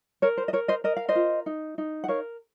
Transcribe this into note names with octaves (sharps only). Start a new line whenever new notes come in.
A#4 C#5
C5
D#5
A#4 C#5
C5 D#5
A#4 D#5
F5
C5 D#5
F4
D#4
D#4
F#5
A#4 C#5 F5